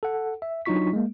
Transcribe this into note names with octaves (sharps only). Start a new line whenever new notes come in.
A4 F#5
E5
F#3 D4 D#4 F4 C#6 B6
G#3 A#3